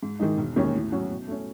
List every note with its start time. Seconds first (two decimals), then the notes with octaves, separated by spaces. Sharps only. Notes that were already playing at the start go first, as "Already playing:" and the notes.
0.03 G#2
0.19 D#3 G#3 D#4
0.37 E1
0.56 D#2 D#3 G#3 C#4
0.74 A2
0.92 F#3 C#4 F#4
1.10 B2
1.28 A3 C#4